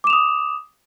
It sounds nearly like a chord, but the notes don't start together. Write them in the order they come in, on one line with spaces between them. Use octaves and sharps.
D6 E7 F7 D#6